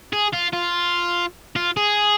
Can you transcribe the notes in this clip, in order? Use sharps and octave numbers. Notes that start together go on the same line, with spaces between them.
G#4
F4
F4
F4
G#4